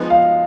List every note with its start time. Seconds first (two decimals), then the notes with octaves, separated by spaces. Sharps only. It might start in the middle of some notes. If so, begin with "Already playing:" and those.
Already playing: F3 G#3 B3 D#4
0.10 F5